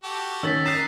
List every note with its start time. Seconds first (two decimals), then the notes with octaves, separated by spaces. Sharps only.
0.04 F#4 G4 A4
0.43 D#3 C#4 E6 A6 B6 F#7
0.66 D#4 F#6 A6 C7 E7